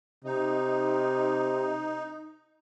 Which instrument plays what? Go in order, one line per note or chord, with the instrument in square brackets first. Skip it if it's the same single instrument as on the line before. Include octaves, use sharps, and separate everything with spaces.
[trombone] C3 [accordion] D#4